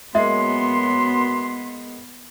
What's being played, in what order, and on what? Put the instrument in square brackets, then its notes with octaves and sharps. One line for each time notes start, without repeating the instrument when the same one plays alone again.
[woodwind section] F#2 C6 [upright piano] G#3 A#3 [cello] B3 [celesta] E5